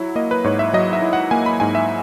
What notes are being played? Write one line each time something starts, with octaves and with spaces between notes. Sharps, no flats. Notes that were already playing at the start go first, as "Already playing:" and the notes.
Already playing: F#3 E4
A#3 D#5
B4
G#2 C#5
E5
F#3 D#5
E5
E4
F#5
A#3 G#5
B5
G#2 G#5
E5